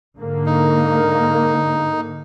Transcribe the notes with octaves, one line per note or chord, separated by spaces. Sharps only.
G#2 D3 A#3
D#4